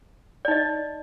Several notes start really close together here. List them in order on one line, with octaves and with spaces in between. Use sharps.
D5 D#4 D#5